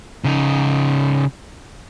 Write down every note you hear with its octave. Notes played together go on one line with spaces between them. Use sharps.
C#3 D#4